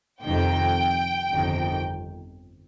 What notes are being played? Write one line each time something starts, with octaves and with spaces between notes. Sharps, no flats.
F2 C3 D#3 G5
G1 F2 C3 D#3